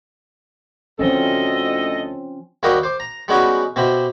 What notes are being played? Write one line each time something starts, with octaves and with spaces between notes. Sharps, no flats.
D2 F3 C4 C#4 A4 D#5
D#2 G3 A#3 F#4 G4 D#5
C5 D6
A#5
G3 G#3 B3 C#4 D#4 F#4
B2 C4 E4 G4